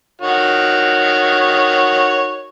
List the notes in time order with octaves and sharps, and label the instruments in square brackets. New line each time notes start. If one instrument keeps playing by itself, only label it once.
[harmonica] D#3 F#4 C#5